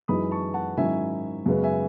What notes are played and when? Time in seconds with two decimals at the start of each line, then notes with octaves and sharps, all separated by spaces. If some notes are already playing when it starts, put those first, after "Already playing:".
0.08 F#2 E3 G#3 D#4 B5 D#6
0.31 A5 C#6
0.54 F#5 A5
0.77 G#2 D#3 F#3 C#4 E4 E5 G#5
1.46 F#2 C#3 G#3 B3
1.63 E5 G#5